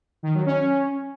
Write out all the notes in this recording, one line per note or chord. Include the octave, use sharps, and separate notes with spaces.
D#3
F#3
C#4